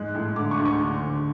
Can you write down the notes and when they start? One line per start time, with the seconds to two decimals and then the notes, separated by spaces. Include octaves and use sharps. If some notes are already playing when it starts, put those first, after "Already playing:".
Already playing: G#2 G#3 F#6
0.15 A2
0.36 D3 D6
0.51 C#6
0.59 D2
0.66 C#6
0.80 D3
1.02 D2